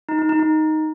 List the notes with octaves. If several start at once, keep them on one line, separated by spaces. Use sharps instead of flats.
D#4
D#4
D#4
D#4